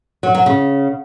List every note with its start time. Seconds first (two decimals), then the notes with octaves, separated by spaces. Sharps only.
0.23 F#3
0.35 F#3
0.46 C#3